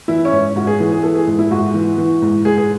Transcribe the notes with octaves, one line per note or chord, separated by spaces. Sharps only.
E3 E4
C#4
G#2
G#2 F#4
G#4
E3 G#4
G#4
E3 A4
G#4
G#2
E4
G#2 F#4
E3
E3
G#2
G#2 G#4
G#4